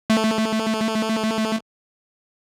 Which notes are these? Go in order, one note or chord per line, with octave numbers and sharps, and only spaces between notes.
A3